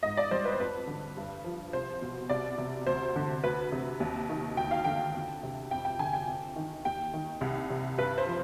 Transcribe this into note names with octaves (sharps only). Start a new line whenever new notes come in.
G#2 D#5
D5
G3 C5
B4
C5
F2 B4
D3
G2
F3
C2 C5
B2
C2 D5
C3
D2 C5
D3
D2 B4
C3
D#2
D#3
D2 G5
F5
D3 G5
F2
C3
F2 G5
G5
D3 G#5
G5
F2
D#3
D#2 G5
D#3
C2
C3
G2 B4
C5
F3